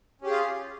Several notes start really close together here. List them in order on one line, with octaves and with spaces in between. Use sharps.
C#4 G4 G#4 F4 F5